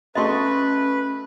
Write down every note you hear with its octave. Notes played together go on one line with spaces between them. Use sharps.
A3 C#4 F#4 G#4 B4 D#5 C6 C#6